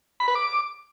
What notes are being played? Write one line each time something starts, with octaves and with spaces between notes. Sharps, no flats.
B5
B4
D6